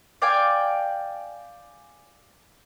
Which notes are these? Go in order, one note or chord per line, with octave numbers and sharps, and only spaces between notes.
D5 F5 G5 G#5